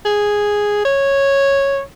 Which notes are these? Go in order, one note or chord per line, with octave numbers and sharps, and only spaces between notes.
G#4
C#5